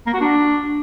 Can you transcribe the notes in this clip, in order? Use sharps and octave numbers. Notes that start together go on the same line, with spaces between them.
A#3
F#4
D4